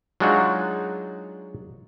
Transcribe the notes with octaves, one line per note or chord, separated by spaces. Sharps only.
F#3 G#3 D4 D#4 F4 F#4